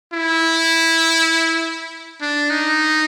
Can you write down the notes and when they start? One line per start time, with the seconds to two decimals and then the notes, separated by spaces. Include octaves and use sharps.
0.13 E4
2.21 D4
2.50 D#4